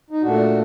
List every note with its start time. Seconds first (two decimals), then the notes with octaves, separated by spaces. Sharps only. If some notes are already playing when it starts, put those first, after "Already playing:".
0.10 D#4
0.22 A#2 A3 D4 F#4